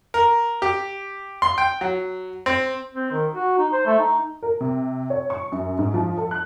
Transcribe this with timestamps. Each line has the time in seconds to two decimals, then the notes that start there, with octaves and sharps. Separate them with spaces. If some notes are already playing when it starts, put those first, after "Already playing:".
0.14 A#4
0.62 G4
1.42 C6
1.58 G5
1.81 F#3
2.46 C4
2.95 C4
3.12 D#3
3.34 F#4
3.58 D#4
3.73 C5
3.86 A3
3.99 D#4
4.43 A#4
4.61 C3
5.10 C#5
5.30 C#6
5.52 F#2
5.79 G#2
5.94 F3
6.18 A4
6.31 F#6